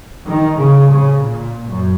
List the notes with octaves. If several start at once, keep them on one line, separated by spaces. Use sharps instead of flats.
D#3
C#3
C#3
A#2
F#2